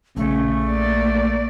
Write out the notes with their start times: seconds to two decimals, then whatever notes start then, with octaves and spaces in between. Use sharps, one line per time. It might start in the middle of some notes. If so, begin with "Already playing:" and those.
0.17 A#1 C#3 A3
0.69 A#3 D5